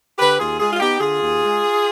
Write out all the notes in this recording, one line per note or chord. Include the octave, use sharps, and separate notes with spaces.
D3 G4 B4
D#2 F4 G#4
G#3 F4 G#4
F4
B3 D#4 G4
D3 F4 G#4
D#2
G#3